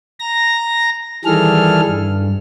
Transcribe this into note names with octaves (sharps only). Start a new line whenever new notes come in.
A#5 A#6
D#3 E3 G3 G#4 A4 F6
G2